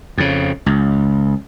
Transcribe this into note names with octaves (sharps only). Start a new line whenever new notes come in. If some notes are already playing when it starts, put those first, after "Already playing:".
F2 C#3
C#2